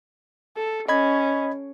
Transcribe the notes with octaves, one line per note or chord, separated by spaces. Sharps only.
A4
C#4 D#5 B5 G#6